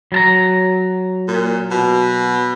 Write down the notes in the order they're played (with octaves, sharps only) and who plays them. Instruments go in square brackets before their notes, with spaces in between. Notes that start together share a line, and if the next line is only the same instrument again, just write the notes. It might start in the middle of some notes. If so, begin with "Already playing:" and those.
[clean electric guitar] F#3 A5 A#5
[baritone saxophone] A#2
B2